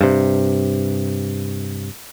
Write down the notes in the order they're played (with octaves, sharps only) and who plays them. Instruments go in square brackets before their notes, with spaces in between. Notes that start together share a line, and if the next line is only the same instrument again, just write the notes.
[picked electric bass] G2 C3